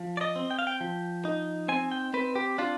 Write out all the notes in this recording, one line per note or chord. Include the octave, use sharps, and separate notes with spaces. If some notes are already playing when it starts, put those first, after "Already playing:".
Already playing: F3
D5
D#5
C4
G5
F5
G5
F3
D#4
C4 G#5
G5
C4 B4
G4
D4 F4